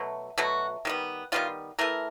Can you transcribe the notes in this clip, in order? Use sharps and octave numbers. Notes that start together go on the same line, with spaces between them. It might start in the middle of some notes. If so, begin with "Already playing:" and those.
Already playing: B2 F#3 A3
B2 F#3 A3 F#4
D#3 G3 B3
D#3 G3 B3 F4
E3 A3 A#4